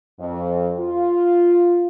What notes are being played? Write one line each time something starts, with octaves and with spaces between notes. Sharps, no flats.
F2
F4